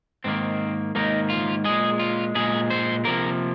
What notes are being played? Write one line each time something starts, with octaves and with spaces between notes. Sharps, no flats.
G#2 D#3 A#3 C4
G#2 D#3 A#3 D#4
F4
A#2 G#3 G#4
F4
A#2 G#3 G#4
C5
C3 F3 A#3 A#4